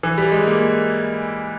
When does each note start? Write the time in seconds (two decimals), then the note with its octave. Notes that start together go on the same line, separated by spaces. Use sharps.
0.03 E3
0.18 G3
0.32 G#3
0.47 A#3